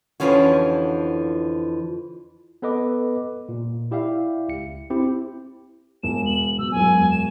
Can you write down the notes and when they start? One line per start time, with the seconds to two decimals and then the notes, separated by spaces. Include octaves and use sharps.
0.20 F2 D3 E3 F3 C#4 F#4
2.62 B3 A4 B4 D#5 D6
3.49 A#2
3.91 E4 G4 D5 E5 F5
4.48 C#2 C#7
4.90 C4 E4 G4
6.03 E1 E7
6.26 F#7
6.59 B2 E6
6.72 E1 F#2 G#5
7.11 E7